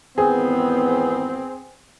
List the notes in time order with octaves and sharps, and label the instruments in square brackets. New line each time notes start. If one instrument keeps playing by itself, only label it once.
[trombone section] G#1 E2 B3 [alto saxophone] C4 [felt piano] G#4